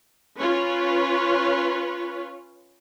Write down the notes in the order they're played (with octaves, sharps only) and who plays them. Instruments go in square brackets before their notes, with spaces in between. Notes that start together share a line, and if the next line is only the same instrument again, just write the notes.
[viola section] C#4 F4 B4 C#5